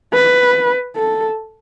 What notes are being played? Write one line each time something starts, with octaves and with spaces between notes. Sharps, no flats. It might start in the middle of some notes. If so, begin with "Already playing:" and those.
B4
A4